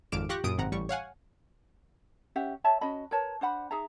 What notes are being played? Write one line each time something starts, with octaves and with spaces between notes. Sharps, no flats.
G#1 F2 D6 F6 D7 E7
F4 G4 C#6 F#6 A#6
F#2 A#2 D#6 D7
G#1 C3 F#5 A#5
A1 G3 C#6
C#5 F5 F#5 G#5
C#4 G4 E5 F#5
C#5 E5 A5
C#4 F#4 D#5 B5
A#4 B4 C#5 A5
D4 C5 F#5 B5
D#4 G#4 E5 A#5